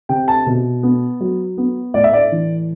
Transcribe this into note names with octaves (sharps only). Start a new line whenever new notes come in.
C3 G5
A5
B2
B3
F#3
B3
A2 D5
E5
D5
E3